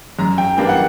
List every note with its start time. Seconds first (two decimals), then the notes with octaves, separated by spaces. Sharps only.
0.19 F#2 A#5
0.38 G5
0.57 E3 G3 A#3 D4 G5
0.69 F#5